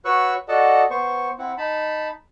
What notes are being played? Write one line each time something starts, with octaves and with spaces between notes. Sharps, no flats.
F#4 B4 C#5 C#6 E6 F#6
F#4 A4 D5 D#5 F#5 A5
B3 C5 C#6
C4 E4 F#5
D#4 A5 B5